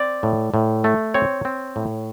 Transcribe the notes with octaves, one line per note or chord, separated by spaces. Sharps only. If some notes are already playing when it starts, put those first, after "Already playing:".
Already playing: C4 D5
A2
A2
A3
C4 C#5
C4
A2